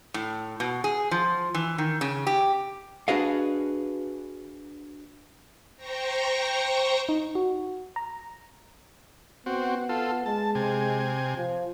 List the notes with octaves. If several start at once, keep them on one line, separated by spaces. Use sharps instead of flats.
A2
B2
G#4
F3
E3
D#3
C#3
G4
D4 F#4 G#4 B4 D#5 F5
C5 G5 A#5 C#6 A#6
D#4
F#4
A#5
B3 C4 F#4
F4 A4
G#3 A5
C3 G#5
F3